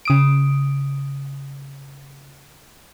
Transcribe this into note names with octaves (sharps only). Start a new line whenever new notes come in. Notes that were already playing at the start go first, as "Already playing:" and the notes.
C#3 D#6 D7